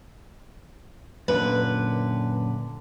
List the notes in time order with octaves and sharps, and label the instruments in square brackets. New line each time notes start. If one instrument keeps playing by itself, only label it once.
[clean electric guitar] F#2 A#2 D3 [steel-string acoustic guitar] B4